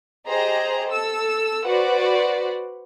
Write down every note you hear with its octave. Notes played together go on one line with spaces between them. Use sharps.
G4 G#4 C5 D#5 A#5
A4 E6
F#4 B4 C5 D5 F#5